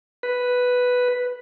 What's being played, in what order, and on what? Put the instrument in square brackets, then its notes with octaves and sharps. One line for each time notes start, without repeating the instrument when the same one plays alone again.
[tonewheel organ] B4